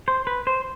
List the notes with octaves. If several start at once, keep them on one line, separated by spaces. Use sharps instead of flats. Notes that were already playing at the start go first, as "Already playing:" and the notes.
C5
B4
C5